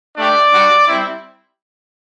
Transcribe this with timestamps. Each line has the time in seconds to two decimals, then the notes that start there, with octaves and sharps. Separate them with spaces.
0.17 A3 D4 G4 D5
0.52 G3 D4 F#4
0.88 G3 C4 E4